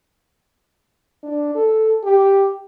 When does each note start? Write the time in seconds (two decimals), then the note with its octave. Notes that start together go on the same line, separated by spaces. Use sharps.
1.23 D4
1.55 A4
2.04 G4